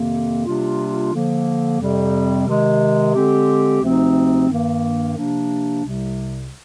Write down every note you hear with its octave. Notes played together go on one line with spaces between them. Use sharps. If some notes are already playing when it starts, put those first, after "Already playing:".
Already playing: F2 C3 D#3 A#3
C3 G3 A#3 D4 F4
D3 F3 A#3
F2 C3 G3
C3 D#3 G#3
D3 G#3 C4 G4
D2 C3 F3 C4 D#4
G2 D#3 A#3
C3 F3 A#3 D4
C2 C3 G3